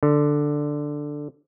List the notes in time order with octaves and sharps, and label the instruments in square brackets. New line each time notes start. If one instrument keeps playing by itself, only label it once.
[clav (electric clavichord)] D3